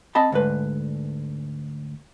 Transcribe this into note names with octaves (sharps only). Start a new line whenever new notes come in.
C4 D#5 A5 B5
D2 G#2 B4